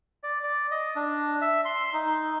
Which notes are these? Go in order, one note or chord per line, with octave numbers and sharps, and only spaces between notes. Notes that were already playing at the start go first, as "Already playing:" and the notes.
D5
D5
D#5
D4
E5
C6
D#4